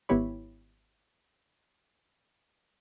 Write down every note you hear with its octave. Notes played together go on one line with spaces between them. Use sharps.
G#1 B3 E4 G4 C#5 B5